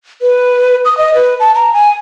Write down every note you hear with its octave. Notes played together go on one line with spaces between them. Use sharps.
B4
D#6
D#5
B4
A5
A#5
G#5